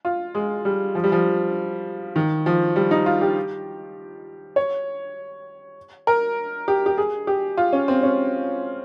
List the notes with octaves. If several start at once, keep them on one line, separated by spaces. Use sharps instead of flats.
F4
G#3
G3
F3
G3
F3
D#3
F3
G3
D#4
F4
G4
C#5
A#4
G4
G4
G#4
G4
F4
C#4
C4
C#4